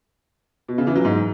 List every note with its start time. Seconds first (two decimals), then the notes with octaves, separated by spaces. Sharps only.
0.68 B2
0.78 C#3
0.87 E3
0.95 F#3
1.05 G#2